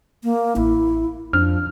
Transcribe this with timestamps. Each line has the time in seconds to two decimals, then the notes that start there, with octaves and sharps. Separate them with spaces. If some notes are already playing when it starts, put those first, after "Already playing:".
0.24 A#3
0.56 A1 E4
1.33 F2 F3 D4 F6